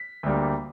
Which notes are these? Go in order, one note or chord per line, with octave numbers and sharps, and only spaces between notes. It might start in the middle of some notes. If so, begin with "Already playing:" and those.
Already playing: B6
D2 D3 G3 A#3